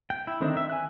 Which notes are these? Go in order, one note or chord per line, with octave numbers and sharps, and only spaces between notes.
G5
E4
D3 D#3 C4 D4 D#4
E5
G#5 F#6